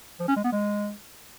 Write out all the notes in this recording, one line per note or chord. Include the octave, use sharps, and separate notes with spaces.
F3
C#4
G#3
B3
G#3